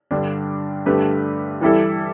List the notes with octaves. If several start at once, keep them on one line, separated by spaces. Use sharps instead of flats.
G2 D3 G3 D4
G2 D3 A3 G4 B4
E3 G3 E4 A4